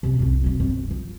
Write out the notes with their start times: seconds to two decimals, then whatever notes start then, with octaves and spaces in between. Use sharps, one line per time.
0.03 C3 C#4
0.19 C2 F2
0.44 C3 F#3
0.60 G1 C4
0.87 E3 F3